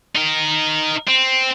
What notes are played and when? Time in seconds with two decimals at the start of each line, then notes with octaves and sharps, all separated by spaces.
0.16 D#4 A#4
1.08 C4